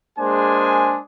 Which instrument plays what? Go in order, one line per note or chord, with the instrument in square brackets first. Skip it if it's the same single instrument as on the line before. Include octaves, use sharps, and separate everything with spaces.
[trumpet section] G#3 A#3 D4 G#4 C5 G#5